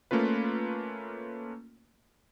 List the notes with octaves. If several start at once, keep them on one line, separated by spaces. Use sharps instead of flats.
A3 A#3 C#4 F4 B4